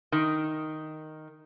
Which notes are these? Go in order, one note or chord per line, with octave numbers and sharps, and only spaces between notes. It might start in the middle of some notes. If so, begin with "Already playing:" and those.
D#3